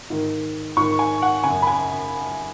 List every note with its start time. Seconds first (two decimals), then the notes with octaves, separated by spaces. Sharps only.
0.10 G#2 D#3
0.77 G#2 D#3 C#6
0.99 G#5
1.22 F#5
1.44 C#3 G#5
1.49 F#2
1.62 B5
1.67 G#5